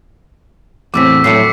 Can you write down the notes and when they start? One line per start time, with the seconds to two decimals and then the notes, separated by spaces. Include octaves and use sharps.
0.94 E2 A2 C4 D6 E6 B6
1.24 A2 F#3 A3 C7 C#7